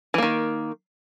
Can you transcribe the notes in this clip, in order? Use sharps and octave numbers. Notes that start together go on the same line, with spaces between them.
D#3 E3 A#3